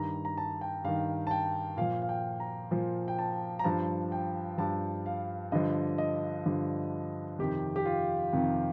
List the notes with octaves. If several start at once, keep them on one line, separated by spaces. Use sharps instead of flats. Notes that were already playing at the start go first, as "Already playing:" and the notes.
Already playing: G2 D#3 A#5
A#5
A5
G5
G2 D#3 F5
A5
G5
A#2 F3 F5
F5
G5
A#5
A#2 F3
G5
A5
A#5
G2 F3 A5
G5
G2 F3 A5
F5
G2 D3 F3 D#5
D#5
G2 D3 F3
F2 C3 D#3 G4
G4
F4
F2 C3 D#3